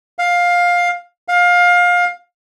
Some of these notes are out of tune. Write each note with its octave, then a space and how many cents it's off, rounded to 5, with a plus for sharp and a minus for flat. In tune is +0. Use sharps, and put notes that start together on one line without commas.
F5 +15
F5 +25